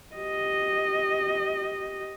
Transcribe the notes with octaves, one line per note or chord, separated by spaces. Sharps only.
G4 D#5